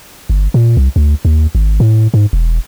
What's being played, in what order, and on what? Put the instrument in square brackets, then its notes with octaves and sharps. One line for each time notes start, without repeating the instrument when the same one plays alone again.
[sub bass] G1
A#2
C2
D2
D#2
G#1
A2
G#2
E1